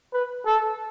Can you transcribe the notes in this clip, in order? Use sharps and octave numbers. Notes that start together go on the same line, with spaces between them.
B4
A4